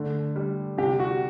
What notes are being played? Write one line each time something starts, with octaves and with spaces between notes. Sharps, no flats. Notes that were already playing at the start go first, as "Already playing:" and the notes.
Already playing: D3 A3
G3
C3 G4
F#4